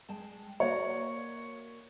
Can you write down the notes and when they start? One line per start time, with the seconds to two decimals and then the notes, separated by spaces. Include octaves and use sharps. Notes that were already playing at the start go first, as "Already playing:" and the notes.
0.09 G#3 G5 A5
0.60 A#3 F#4 C#5 D5